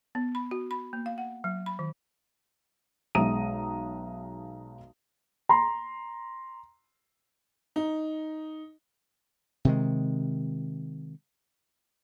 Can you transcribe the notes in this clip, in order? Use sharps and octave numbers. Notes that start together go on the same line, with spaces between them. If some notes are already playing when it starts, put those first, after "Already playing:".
B3
B5
F#4
B5
A#3
F5
F#5
F#3
B5
D#3
B1 G#3 E5 A#5 D#6 D#7
A#5 C6
D#4
C3 D#3 G#3